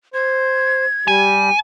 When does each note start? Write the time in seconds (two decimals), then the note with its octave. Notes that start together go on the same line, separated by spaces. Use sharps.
0.14 C5 G#6
1.08 G3 G4 G#5